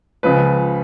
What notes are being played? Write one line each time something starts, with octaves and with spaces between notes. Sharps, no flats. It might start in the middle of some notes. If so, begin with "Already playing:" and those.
C#2 C#3 F3 B4